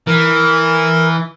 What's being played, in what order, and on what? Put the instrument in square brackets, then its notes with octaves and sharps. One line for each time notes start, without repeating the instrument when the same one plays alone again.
[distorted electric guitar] E3 [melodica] A#4